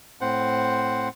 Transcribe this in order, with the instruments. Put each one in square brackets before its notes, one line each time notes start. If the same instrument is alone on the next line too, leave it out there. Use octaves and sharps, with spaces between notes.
[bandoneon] A2 C4 C5 F#5